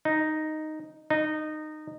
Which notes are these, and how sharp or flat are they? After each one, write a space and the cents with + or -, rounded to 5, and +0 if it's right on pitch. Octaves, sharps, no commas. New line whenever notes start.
D#4 -5
D#4 -20